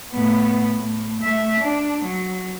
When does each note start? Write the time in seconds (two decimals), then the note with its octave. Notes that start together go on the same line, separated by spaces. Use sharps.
0.11 A2 B3
0.76 A2
1.22 A3 E5
1.60 D4
2.05 F#3